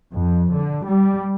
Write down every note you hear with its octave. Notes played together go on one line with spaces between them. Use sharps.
F2
D3
G3